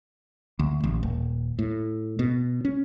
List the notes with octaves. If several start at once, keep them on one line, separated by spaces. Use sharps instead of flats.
D2
A1
D#1
A2
B2
C#4